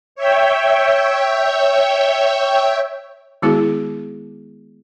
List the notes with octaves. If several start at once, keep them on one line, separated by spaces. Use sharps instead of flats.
C#5 E5 G5
D#3 G#3 B3 E4 F#4 G#4